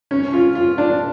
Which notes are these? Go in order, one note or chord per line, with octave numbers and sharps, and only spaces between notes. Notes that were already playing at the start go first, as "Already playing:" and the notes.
C#4
F4
F4
D4